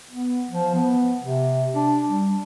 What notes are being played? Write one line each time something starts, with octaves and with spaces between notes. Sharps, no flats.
B3
F3
B3
C3
D4
G3